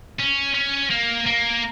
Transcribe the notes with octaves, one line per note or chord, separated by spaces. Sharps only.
C#4
C#4
A#3
A#3